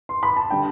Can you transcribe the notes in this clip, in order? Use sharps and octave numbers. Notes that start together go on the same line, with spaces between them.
C6
B5
A5
D3 G3 G5